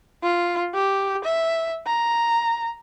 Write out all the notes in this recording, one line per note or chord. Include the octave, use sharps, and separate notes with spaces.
F4
G4
E5
A#5